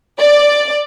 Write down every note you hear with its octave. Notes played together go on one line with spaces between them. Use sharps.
D5